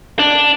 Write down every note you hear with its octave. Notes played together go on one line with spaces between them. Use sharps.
D4